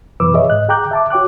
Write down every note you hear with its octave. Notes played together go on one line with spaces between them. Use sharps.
F#2 B2 E3 B4 D6 E6
G#4 C#5 D#5 E5
G#2 D#5 F#6
G#4 G5 A#5 D6 F#6 G6
E5 A5 D6
F#4 C#5 G5 D6 F#6